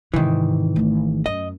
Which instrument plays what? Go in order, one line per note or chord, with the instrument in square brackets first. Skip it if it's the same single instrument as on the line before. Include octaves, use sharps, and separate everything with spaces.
[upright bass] G#2 C3 [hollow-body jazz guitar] D#3 E3
[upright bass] G#1 A3
[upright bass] F#2 [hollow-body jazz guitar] D#5